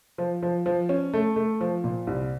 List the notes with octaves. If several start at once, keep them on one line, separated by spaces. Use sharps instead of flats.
F3
F3
F3
C#4
A3
A3
F3
A#2
C2